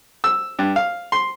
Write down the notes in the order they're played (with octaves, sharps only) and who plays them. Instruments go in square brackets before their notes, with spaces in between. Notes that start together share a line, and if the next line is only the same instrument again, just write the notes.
[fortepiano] E6
G2
F5
C6